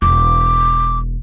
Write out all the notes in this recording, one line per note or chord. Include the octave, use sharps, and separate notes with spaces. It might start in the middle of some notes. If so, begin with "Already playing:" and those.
E1 D6